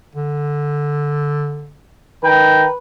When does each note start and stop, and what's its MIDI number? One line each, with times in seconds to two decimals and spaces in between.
0.15 1.74 50
2.23 2.65 51
2.23 2.77 71
2.23 2.65 79
2.23 2.65 82